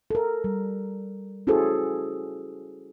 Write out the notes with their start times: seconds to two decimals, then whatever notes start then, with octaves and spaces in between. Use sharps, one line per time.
0.11 A4 A#4
0.44 G3
1.47 C#4 E4 F#4 G#4 A4 C5